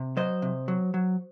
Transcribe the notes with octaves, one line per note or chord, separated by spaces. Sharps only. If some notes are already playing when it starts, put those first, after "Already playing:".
Already playing: C3
F#3 C5 D#5
C3
F#3
F#3